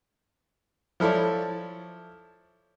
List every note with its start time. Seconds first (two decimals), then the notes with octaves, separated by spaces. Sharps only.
1.00 F3 E4 A4 C#5 D5